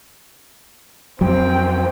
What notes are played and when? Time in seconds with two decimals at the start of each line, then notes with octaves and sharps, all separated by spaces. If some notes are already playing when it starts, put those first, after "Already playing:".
1.21 F2 F#3 C4 G5